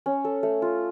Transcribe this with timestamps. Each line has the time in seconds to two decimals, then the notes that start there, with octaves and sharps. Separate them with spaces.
0.06 C#4
0.25 A4
0.43 A3
0.62 F4